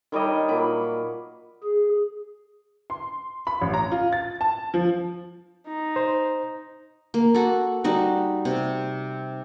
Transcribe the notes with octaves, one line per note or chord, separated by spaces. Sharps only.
D#3 G3 C#5 D#5
A#2 F#3 B5 D6
G#4
C6
B5
A1
A#5
F4
A6
A5
F3
D#4
C5
A#3
F#4 A4
G3 D#4 F#4
C3